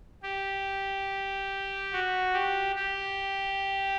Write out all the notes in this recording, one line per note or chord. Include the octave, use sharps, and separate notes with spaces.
G4
F#4
G4
G4